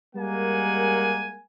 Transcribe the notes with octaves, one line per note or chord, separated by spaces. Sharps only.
G3 G#3 A#3 A#4 F#5 G#5